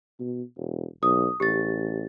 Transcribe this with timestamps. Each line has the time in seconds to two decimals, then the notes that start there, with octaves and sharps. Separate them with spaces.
0.19 B2
0.57 E1
1.03 B1 D#6
1.40 A1 G4 A6